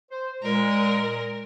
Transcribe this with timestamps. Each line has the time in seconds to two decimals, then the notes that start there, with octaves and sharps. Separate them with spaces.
0.11 C5
0.43 A#2 G#3 A#4